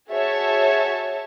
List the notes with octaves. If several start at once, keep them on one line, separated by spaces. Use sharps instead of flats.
F#4 G#4 C#5 E5 A5